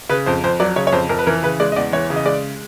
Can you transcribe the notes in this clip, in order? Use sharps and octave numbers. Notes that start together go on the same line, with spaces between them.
C#3 B4
F2 C5
F2 C5
F#3 D5
C#3 C#5
C#5
F2 C5
F2 A#4
B4
E3 A#4
C#3 B4
G#3 D5
D#5
E2 D5
E3 C#5
C#3
D#5
G#3 D5